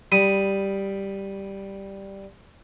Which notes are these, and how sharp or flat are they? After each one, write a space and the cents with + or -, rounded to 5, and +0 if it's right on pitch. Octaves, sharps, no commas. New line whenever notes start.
G3 +0 B5 +0 D#6 +0